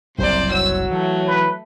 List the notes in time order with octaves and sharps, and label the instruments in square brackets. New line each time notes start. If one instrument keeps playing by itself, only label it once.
[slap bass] F#1 C2 [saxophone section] C3 [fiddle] C5 D5
[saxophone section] F#3 [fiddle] E6
[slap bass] E3 [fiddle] A3
[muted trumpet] B4